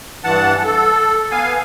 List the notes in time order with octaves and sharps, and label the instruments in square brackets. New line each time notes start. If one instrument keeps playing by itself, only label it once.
[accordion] G2 E3 F#5 A5
A4
B3 F5 G#5